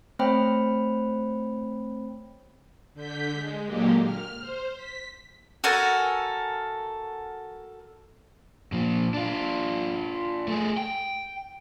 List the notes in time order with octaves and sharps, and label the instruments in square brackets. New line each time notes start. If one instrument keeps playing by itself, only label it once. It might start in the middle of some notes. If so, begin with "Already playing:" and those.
[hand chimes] A3 C4 C5 C#5 G5 B5
[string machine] D3 G6 B6
G#3
A#2 D3 F#3 G#3 A#3 G4
F6
C5
B6
[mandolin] F#4 A4 A#4 G#5
[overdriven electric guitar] A#2 F3
D4 F4
A3 G#4
G5